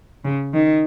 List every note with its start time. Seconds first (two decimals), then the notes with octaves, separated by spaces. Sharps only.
0.24 C#3
0.53 D#3